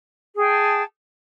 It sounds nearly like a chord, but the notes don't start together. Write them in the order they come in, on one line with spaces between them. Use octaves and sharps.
G#4 G5 A5